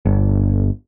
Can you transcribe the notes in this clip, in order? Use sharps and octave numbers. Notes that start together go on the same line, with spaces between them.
G1